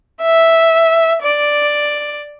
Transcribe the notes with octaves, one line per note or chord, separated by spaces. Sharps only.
E5
D5